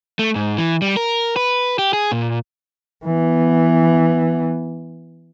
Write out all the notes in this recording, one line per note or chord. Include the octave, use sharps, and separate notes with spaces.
A3
G#2
E3
G3
A#4
B4
G4
G#4
A#2
E3 B3